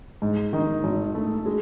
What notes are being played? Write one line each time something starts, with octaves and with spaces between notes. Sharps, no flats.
G#2
D#3
G#1
A3
G#3